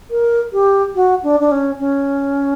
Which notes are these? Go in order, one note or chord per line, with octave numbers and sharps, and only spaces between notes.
A#4
G4
F#4
D4
D4
C#4
C#4